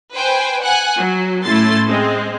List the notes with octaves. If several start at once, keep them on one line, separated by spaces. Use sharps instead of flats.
B4 C5 G5 G#5
F#5 G#5 F#6
F#3
A2 A3 C#4 E4 C6 A6
G#3 C4